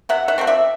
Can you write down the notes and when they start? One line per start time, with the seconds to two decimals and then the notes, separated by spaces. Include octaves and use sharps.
0.09 C3 E5 F#5
0.28 E5 F#5
0.38 F3 A3 C4
0.47 D5 E5